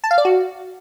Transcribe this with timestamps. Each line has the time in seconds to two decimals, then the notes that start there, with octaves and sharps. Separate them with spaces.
0.04 A5
0.11 F5
0.18 D5
0.25 F#4